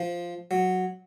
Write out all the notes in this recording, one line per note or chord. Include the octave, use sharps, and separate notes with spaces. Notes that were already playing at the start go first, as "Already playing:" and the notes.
Already playing: F3
F#3